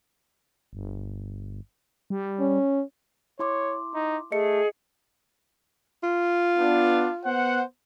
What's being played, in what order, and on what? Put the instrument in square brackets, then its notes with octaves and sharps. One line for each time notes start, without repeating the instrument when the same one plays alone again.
[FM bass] G1
G3
[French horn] C#4
[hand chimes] E4 C6 D6 [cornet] C#5
[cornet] D#4
[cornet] A3 [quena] G#4 [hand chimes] D#5 C#7
[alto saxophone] F4
[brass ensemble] B3 D4
B3 C5 F#5